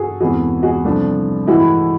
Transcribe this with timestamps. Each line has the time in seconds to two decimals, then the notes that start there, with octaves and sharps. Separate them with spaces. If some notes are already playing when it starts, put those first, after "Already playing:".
Already playing: F#4 G#4 A4
0.20 E1 E2 C3 E3 F#4 G#4
0.63 F#4 G#4
0.84 C2 C3 F3 A3 D4
1.47 A2 E3 G#3 E4 F#4